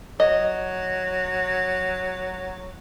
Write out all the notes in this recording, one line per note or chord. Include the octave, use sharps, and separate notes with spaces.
F#3 D#5